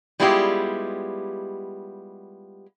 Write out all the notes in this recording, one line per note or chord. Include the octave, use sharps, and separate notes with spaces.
G3 G#3 B3 E4 F4 G4